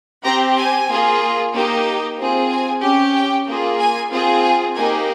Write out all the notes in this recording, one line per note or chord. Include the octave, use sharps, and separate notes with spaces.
C4 G4 A#5
G#5
A#3 F4 G#4
A#3 D#4 G4
C4 F4 G#4
G#5
C#4 G4
G5
A#3 F4 G#4
G#5
C4 F4 G#4
G#5
A#3 D#4 G4 G#5